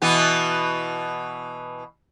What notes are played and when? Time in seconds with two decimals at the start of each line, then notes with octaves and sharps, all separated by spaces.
0.02 B2 E3 B3